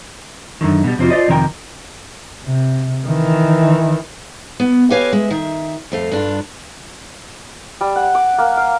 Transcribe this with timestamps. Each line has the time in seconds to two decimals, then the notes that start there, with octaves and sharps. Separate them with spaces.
0.61 F#2 A2 D3 D#3
0.84 B2 G3
0.98 F2 C3 C4 F4 F#4
1.10 F4 C5 D5 D#5
1.28 F2 C3 D#3 A#3 A#4 G5
2.44 C3
3.06 D#3 E3
4.60 B3
4.90 G4 B4 C#5 D#5 F5 G#5
5.13 G#3 E5
5.31 D#3 E5
5.92 F2 A3 F5
6.11 G2 D4 F4
7.81 G3
7.96 F#5
8.15 D6
8.38 A#3
8.57 F5